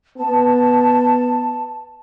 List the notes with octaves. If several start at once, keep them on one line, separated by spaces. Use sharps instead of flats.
B3 A5